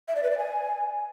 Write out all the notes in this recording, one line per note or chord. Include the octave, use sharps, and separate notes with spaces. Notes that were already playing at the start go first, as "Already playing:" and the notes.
E5
D5
B4
D5
G#5